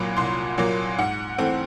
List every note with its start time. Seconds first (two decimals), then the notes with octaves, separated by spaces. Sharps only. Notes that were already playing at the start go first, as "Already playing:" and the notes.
Already playing: C2 A#2 F#3 A#3 B5
0.17 C2 C6
0.58 A#2 F#3 A#3
0.99 G#2 F#5
1.38 E3 A3 C4